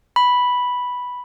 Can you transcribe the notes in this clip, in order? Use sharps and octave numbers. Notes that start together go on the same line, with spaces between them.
B5